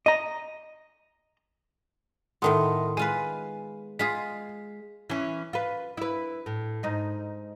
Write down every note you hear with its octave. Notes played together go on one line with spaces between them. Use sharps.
D#5 A#5
A2 D#3 B3 A4 A#4 E5 C6 D#6
G#3 F4 B4 G#5 D#7
G#3 F4 G#4 B6
E3 C#4
F4 B4
E4 B4
A2
G#2 D#4